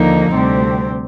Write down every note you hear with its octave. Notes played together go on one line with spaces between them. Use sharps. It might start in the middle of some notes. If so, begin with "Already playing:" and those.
Already playing: D#2 D3 F3 A#3 D#4
D2 C3 G3 C4